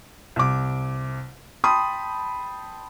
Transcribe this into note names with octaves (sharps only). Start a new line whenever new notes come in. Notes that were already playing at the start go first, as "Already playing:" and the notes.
C2 D6
G5 A5 B5 C6 D#6